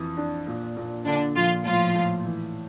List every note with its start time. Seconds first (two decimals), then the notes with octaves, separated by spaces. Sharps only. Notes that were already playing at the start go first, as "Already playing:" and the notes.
Already playing: F2 E3
0.17 D4
0.47 A#2
0.77 A#2
1.06 A#2 D3 D4
1.36 A#2 F3 F4
1.65 A2 F3 F4
1.95 A2
2.25 E3